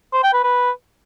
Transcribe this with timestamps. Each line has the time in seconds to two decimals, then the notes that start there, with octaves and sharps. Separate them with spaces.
0.13 C5
0.23 G5
0.33 B4
0.44 B4